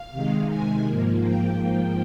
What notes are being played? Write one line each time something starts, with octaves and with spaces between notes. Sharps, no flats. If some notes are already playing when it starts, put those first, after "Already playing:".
Already playing: F5
C3 D#3 G#3
G#5
G#2 F3 A#3
G5
G#2 F3 A#3